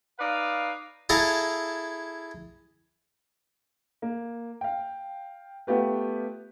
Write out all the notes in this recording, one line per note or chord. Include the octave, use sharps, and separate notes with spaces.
D#4 B4 D5 F5
E4 G#4 A4 F5 A5 A#5
A#3
F5 G5
A3 B3 F4 G4 B4